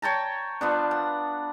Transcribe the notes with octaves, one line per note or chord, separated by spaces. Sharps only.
C#5 G5 A5 A#5
F3 B3 D4
F#5